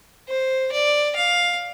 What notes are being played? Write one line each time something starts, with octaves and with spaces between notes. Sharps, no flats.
C5
D5
F5